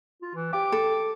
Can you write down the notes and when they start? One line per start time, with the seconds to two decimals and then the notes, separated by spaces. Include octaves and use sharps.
0.22 F4
0.34 E3
0.53 G4 D6
0.72 A4